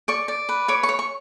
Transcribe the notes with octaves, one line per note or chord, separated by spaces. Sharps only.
D5 C#6
D5
B4
C#5 D6
C#6
C#5
C#6